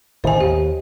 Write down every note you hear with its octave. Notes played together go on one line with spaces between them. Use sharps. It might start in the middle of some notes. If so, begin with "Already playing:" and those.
A1 A2 D#3 C5 G#5
D#2 G4